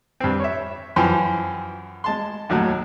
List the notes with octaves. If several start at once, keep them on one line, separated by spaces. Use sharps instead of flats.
G2 C4
C#5 E5
F#2 E3 F3 G5 C6
G#3 A5 C6
D#2 A2 F#3 F#5